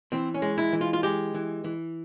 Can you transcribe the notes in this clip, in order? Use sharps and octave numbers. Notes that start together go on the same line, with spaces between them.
E3 C4
C#4
G#3
E4
E3
F4
F4
G#3 G4
E3
E3